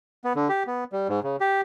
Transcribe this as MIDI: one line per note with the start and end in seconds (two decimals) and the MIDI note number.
0.24 0.33 59
0.36 0.48 50
0.49 0.63 67
0.67 0.84 59
0.93 1.08 55
1.09 1.20 44
1.23 1.36 49
1.40 1.61 67